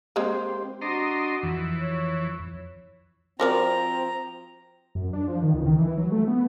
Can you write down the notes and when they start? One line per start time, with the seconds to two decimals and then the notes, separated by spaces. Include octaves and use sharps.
0.16 G#3 A#3 C4 G4 C5
0.81 D4 F#4 D#5 A#5 C6
1.43 F2 E3
1.78 C#5
3.40 F3 C4 F#4 A#4 D5 A#5
4.95 F#2
5.13 D4
5.28 F3
5.42 D#3
5.54 C#2
5.66 D#3
5.78 E3
5.97 F#3
6.12 A3
6.27 B3